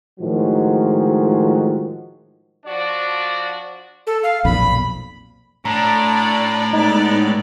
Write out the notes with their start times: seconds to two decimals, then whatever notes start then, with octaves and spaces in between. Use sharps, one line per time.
0.20 A2 D#3 F3 F#3 G#3
2.65 F3 D4 F#4 D5
4.07 A4
4.23 F5
4.45 B1 F2 A#2 B5
5.65 A2 D4 D5 A#5
6.73 G#3 B3 D#4 D5